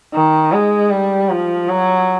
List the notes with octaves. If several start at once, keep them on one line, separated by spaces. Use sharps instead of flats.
D#3
G#3
G3
F3
F#3